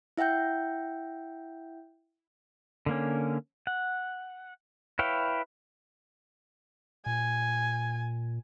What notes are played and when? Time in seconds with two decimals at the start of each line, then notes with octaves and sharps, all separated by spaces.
0.18 E4 E5 F#5 G5 G6
2.86 D3 A#3 C#4
3.67 F#5
4.99 E4 B4 C#5 F5 G5
7.06 A#2 G#5